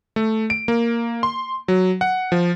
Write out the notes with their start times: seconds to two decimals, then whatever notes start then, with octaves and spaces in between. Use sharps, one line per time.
0.16 A3
0.50 D7
0.68 A#3
1.23 C6
1.68 F#3
2.01 F#5
2.32 F3